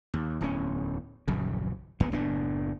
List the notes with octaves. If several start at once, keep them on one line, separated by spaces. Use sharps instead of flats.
D#2
D1 E2 F3 C#4
D#1 A#1 F#2 C#3
D#2 B3
F#1 A2 B3 D4